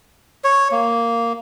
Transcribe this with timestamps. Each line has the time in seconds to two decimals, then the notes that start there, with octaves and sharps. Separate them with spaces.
0.44 C#5
0.71 A#3